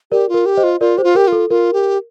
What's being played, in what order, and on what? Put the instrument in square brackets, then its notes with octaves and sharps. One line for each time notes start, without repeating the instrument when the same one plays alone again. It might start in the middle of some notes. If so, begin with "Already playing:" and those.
[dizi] G4 [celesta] A#4 D5
[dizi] F4
[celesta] A#4
[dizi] G4
[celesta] C5 D#5
[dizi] F4
[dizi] F4 [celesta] A#4 D5
[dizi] G4 [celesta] C5
[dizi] F4
[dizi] G4 [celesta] A#4
[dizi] F4 [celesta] A4
[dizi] F4 [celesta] A#4
[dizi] G4